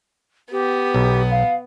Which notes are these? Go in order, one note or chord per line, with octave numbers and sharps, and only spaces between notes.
B3 G4
B1
F5